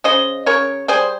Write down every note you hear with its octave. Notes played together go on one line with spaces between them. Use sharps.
C#3 C5 D#5
C#3 A#4 C#5
G3 G#4 C5